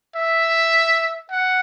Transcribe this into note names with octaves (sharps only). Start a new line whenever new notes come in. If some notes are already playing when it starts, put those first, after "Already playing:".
E5
F#5